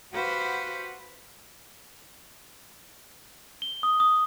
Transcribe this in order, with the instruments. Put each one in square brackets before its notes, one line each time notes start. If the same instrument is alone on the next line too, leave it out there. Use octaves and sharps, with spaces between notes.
[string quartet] F#4 G4 B4 C5 F5 F#5
[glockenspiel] G7
D#6
D#6